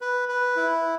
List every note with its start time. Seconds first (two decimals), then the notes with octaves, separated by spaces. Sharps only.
0.01 B4
0.29 B4
0.56 E4